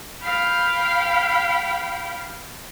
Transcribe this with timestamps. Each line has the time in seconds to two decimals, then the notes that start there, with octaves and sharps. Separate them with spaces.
0.22 F5 G5 B5